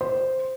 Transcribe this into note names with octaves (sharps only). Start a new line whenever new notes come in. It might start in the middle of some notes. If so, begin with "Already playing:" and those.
C5